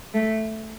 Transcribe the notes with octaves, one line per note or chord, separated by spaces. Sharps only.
A3